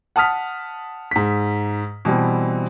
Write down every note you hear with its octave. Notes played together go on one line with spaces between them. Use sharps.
F#5 A5 D#6 F6 B6
G#2 B6
B2 E3 G3 C4